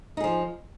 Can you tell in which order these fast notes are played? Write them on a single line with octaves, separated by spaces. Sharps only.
D#4 G#4 F3